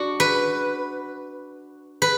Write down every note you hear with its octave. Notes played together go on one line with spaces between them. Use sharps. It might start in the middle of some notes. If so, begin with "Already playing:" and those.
Already playing: D4 F#4
B4
B4